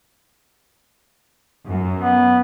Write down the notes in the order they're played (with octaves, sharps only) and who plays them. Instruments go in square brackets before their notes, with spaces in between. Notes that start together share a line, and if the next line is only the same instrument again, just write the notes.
[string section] F#2
[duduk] B3